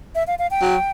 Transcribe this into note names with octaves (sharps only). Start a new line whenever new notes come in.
E5
F5
F5
G5
F#3